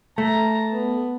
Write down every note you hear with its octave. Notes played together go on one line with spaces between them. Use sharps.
A3 A5 A#5
B3